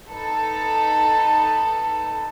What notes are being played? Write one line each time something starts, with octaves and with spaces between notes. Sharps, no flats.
D#4 A4 B4